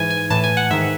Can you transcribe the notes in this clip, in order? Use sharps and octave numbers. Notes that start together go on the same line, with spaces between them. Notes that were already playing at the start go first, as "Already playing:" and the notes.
Already playing: G#2 E3 G#5
G#5
A2 E3 A5
G#5
F#5
G#2 D#3 E5